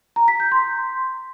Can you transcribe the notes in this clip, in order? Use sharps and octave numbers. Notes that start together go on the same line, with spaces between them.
A#5
B6
G6
C6